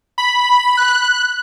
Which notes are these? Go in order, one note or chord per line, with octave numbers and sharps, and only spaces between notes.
B5
F#6